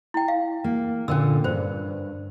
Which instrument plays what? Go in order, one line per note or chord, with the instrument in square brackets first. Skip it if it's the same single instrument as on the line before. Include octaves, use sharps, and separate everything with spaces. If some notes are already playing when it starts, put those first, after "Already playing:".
[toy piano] E4 G5
F5
[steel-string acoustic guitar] A#3
[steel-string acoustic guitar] A#2 D3 [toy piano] C#4 A#4 E6
[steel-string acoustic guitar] G2 [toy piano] C5